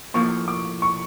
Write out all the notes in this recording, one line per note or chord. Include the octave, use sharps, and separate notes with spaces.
A2 F3 A#3 C#6
D6
C#6